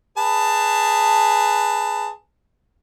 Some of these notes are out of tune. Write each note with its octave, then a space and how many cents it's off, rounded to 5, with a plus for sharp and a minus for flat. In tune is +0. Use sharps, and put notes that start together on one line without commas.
G#4 +0 B4 +0 A5 +15